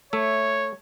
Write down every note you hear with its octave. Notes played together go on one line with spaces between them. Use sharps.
A3 C#5 E5